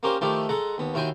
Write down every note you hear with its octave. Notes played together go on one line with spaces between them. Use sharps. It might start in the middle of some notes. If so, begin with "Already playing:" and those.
A#3 C#4 G4 A#4 C5
D#3 F3 A3 E4 G4
G#3 A4 F#5 A#5
D#2 B3
D#2 E4 F#4 G5 G#5 C6